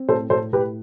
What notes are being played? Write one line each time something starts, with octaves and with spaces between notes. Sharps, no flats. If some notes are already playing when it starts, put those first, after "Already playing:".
Already playing: C4
A2 A4 C5
A2 A4 C5
A2 G4 B4